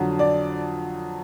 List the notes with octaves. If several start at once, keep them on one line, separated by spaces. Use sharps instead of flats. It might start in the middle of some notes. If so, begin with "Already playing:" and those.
Already playing: F2 D3 F#3
D5